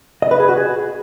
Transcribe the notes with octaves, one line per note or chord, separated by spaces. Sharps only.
D#5
B4
G#4
F#4
G#4